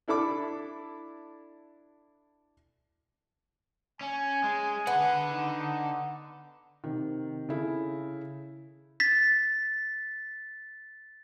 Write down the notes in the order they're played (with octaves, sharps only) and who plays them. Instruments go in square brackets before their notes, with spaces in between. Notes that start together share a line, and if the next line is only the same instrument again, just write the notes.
[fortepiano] D4 E4 A4 B5 D6
[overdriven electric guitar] C#4 [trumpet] G#5
[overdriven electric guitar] G#3
[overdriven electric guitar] D3 F#5 [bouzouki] B3
[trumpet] D#4
[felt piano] C3 D#3
C#3 E4 A4
[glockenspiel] A6 B6